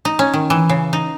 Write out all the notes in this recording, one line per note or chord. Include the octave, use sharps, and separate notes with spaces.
D#4
C#4
D#3
E3
C#3
D#4